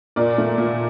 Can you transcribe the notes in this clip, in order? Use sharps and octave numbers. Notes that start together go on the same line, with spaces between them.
A#2 A#4 D5
A3
A#2